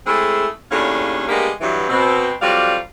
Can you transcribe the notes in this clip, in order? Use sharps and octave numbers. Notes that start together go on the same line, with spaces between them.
G#3 A3 C4 E4 G#4
D#2 A2 C#4 D4 G#4 F5
G3 G#3 A#3 B3 D4 G4
G2 E3 F#3
B2 C4
F2 F#3 G3 F4 D5 F5